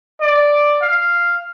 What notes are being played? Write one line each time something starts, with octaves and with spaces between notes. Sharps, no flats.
D5
F5